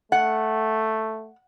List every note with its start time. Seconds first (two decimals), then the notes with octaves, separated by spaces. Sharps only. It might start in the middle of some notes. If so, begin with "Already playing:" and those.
0.12 A3 F#5